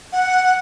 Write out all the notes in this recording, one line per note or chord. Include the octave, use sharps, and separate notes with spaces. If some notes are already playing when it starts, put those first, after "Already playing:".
F#5